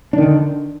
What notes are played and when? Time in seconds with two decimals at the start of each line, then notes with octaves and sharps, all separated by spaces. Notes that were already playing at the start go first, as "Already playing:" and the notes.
0.13 D4
0.18 D#3
0.23 D3